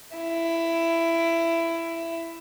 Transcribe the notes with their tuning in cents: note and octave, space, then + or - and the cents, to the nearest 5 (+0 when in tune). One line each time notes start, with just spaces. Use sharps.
E4 +15